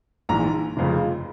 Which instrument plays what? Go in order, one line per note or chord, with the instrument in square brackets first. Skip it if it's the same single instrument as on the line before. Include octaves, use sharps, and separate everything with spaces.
[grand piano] A#1 G#2 E3 A#5
F1 F2 C#3 F3